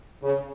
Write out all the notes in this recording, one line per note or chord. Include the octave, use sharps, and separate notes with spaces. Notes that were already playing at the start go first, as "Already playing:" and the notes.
C#3